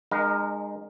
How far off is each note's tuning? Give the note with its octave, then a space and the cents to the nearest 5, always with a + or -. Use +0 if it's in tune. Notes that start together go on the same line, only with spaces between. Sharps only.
G#3 -15 D#4 -40 A#4 +5